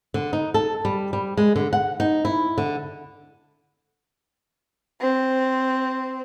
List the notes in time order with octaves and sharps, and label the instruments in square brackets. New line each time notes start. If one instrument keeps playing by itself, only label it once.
[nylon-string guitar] D3
D#4
A4
G3
G3
G#3
D3
F#5
D#4
E4
D3
[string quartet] C4